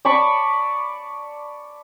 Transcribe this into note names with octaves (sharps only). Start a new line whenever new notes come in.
D5 A5 B5 C#6